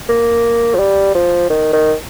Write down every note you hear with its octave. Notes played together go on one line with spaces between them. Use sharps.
A#3
F3
G3
F3
D#3
D#3